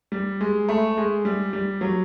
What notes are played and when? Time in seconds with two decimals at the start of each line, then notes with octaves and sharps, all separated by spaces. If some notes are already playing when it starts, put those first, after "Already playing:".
0.12 G3
0.41 G#3
0.69 A3
0.97 G#3
1.25 G3
1.53 G3
1.81 F#3